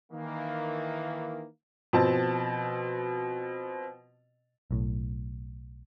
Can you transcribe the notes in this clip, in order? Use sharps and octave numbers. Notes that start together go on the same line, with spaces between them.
D#3 E3 A#3
B2 F3 C4 A5
B1 A2